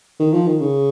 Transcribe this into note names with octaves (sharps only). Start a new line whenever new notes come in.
D#3
F3
D#3
C#3